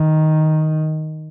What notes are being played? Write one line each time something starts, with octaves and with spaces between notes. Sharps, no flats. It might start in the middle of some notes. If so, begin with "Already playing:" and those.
Already playing: D#3